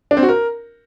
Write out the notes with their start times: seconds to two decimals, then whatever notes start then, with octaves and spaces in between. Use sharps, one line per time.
0.11 D4
0.17 C4
0.23 F#4
0.29 A#4